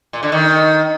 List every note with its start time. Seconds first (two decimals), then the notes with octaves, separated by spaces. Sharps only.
0.13 A#2
0.23 D3
0.32 D#3